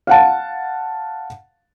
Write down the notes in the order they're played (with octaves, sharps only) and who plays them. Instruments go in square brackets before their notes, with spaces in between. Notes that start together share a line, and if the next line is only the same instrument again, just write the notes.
[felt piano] F5 F#5 A5